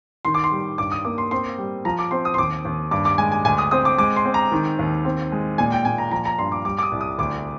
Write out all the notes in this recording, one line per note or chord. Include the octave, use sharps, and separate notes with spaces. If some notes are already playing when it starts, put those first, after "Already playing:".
D#3 C6
D6
C6
G3
G2 D6
D#6
A#3 D6
C6
C4 C6
G3
F3 A#5
D6
C4 C6
D#6
C6
D#2 D6
D#2
G2 D6
D6
G#3 G#5
G#5
D2 G#5
D#6
C4 D#6
D6
G#3 D6
C6
C4
A#5
D#3
D#2
C4
G#3
A#2 G#5
G5
A#2 G#5
A#5
F3 A#5
A#5
G2 C6
D6
G3 D6
D6
D#6
C2
D#6
D2 D6